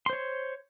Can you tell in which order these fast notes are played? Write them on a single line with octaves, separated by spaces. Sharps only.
C6 C5 C#5